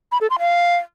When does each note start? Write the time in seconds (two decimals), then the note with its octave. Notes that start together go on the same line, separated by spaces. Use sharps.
0.12 B5
0.21 A4
0.30 C6
0.39 F5